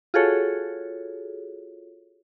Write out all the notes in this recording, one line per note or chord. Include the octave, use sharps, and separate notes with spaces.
F4 F#4 G#4 A4 C#5